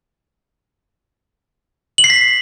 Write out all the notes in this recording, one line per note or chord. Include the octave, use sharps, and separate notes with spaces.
F#7
C7
B6